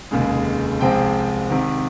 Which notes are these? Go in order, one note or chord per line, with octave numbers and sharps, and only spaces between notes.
F1 D#2 C#3 G#3
C2 C3 F3 G#3 C4 G5
C2 C3 D#3